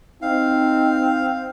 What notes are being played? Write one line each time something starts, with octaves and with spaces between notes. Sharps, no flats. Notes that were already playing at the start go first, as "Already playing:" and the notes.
C4 D#4 F5